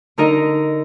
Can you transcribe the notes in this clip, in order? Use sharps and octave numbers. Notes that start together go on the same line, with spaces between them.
D3 D#4 A#4 D#5